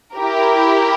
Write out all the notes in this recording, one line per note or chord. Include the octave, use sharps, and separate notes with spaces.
E4 G4 A#4